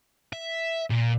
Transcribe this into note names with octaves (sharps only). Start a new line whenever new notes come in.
E5
A#2